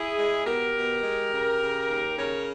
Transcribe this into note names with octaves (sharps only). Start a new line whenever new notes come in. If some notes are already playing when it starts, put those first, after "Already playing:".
Already playing: E4 G#4
G#3
B2 G4 A#4
B2
G#3
C#3
C#3
D#2
C#3 A#4 C#5